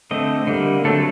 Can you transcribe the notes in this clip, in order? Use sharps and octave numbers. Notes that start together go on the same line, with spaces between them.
D3 A3 C4 D#5
D3 G3 A#3
D3 F#3 A3 C4 A4